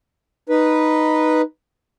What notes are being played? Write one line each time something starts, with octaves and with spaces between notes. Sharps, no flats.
D#4 B4